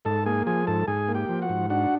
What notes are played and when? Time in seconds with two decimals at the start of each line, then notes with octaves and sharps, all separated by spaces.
0.05 G#2 A4 A5
0.26 A#3 G#4 G#5
0.47 F3 G#4 G#5
0.67 G#2 A4 A5
0.88 G#2 G#4 G#5
1.08 A#3
1.15 G4 G5
1.29 F3
1.42 F#4 F#5
1.49 G#2
1.70 D4 F#4 F#5